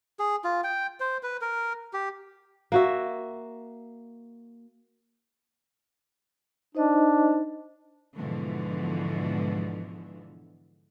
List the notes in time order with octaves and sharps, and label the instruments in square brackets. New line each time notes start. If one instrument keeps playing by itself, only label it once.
[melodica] G#4
F4
G5
C5
B4
A#4
G4
[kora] A#3 F#4 E5
[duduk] D4 [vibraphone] D#4 C5 D#5
[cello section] G#2 B2 D3 E3 F3